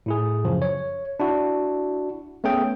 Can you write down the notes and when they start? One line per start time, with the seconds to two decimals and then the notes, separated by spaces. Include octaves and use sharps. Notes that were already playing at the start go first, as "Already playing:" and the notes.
0.06 A2 E4 G#4
0.45 F#2 C#3 F3
0.62 C#5
1.20 D4 E4 F#4
2.44 A3 B3 C#4 G#4 G5